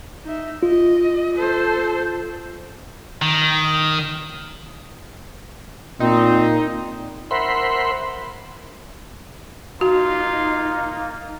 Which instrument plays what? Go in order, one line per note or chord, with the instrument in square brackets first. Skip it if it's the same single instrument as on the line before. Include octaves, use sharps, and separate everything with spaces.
[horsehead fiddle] D#4 E5
[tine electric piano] F4 [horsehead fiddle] D#5
[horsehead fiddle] A4 C5
[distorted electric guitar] D#3
[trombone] A#2 [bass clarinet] C4 [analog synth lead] D#4
[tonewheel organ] A#4 C5 E5 F#5 B5 C6
[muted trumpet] A#3 [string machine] D#4 [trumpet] F4 [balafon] F#4